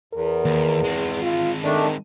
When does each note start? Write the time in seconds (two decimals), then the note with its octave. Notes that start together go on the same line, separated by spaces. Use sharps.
0.13 E2 A#4
0.45 D#2
0.84 G#3 C4
1.22 F4
1.63 D#3 A3 D4